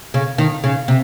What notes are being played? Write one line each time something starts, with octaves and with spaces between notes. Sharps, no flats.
C#3
D#3
C#3
C3